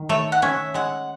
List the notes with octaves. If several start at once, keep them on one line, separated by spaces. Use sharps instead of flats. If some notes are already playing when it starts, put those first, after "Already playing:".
Already playing: D#3
A3 C#5
F#5
C#4 E5
G#3 F#5